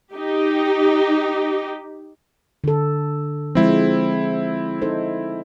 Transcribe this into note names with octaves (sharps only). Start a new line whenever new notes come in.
D#4 G4
D3 A4
F3 G#3 C4 E4
D#4 A4 C5